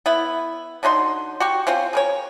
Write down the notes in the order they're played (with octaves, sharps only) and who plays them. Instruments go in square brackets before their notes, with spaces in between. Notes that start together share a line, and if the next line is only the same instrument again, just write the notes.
[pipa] B3 E4
D3 F#3 D#4 C6
F#4 G4 C#6
C4 C#4 F4 C5
G#4 A#4 C#5